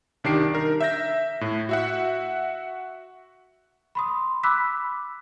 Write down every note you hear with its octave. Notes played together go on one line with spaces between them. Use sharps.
C2 D#3 D4 G4 C7 D7
D#4 A#4
E5 G6 A#6
A2
F#4 E5 F#5
B5 C6 D#6
B5 D6 E6 F#6 B6